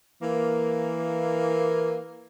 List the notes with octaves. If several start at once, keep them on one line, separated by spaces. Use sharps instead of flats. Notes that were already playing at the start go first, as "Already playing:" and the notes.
E3 A#3